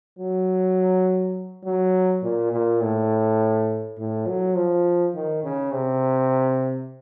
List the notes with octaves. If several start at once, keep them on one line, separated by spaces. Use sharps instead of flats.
F#3
F#3
A#2
A#2
A2
A2
F#3
F3
D#3
C#3
C3